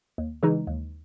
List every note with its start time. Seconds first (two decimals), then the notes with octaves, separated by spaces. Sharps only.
0.18 D#2
0.43 C#3 E3 G#3 D#4
0.67 D#2